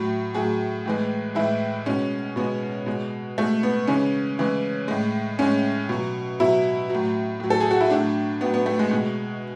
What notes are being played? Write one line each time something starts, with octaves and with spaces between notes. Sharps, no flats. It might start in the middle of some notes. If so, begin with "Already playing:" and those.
Already playing: A2 F#3
A2 F#3 G#4
A2 E3 G#3
A2 E3 G#3 E4
B2 G#3 C#4
B2 G#3 B3
B2 G#3
B2 G#3 A3
B3
C#3 E3 G#3 C#4
C#3 E3 G#3
A2 G#3
A2 G#3 C#4
B2 F#3
B2 F#3 E4
F#3
A2
A2 F#3
A4
G#4
F#4
E4
A2 F#3 D4
A2 F#3 B3
B3
A3
G#3
B2 G#3